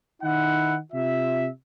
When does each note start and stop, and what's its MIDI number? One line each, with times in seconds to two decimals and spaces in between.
0.23 0.77 51
0.23 0.77 63
0.23 0.77 64
0.23 0.77 78
0.93 1.48 48
0.93 1.48 65
0.93 1.48 76